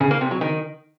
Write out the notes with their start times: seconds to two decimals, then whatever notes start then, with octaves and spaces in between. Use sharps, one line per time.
0.01 C#3
0.11 A#3
0.21 C3
0.31 F#3
0.41 D#3